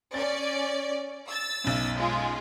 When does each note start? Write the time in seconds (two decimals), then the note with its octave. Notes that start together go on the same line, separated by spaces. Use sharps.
0.14 C#4 D5 A6
1.28 E6 A6
1.64 B1 F#2
1.97 G#3 F4